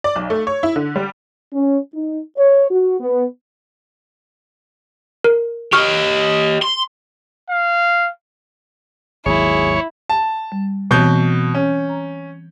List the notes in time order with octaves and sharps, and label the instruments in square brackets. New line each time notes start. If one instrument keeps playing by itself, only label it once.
[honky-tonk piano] D5
B1
A3
C#5
E4
D3
G3
[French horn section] C#4
D#4
C#5
F#4
B3
[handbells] A#4
[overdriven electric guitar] G4 D#5 [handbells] C#6 F6
[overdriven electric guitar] C6
[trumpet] F5
[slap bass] G#1 D#2 F#3 [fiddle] E4 [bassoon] G#4 [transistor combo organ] C#5
[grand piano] A5
[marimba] G3
[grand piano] B2 G6 [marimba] E3 C4 C#5
[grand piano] C#4
[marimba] A#5